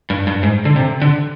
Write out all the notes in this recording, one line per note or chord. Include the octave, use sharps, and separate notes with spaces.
G2
G2
G#2
D3
C3
D3